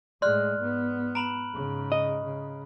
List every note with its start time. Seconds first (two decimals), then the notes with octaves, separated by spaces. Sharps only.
0.22 A2 G#3 D5 C6 F6 F#6
0.58 G#2 B3
1.15 A#5 B5 D7 F#7
1.54 G#2 C#3
1.92 D#5
2.24 C#3